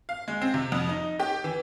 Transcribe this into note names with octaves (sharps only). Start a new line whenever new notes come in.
F5
G#3
C4
C3
F2
D#4
G4
E3